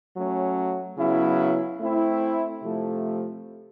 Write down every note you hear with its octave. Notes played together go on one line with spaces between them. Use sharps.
F#3 A3 C#4
C#3 F#3 B3 E4
A3 C4 E4
C3 F3 A3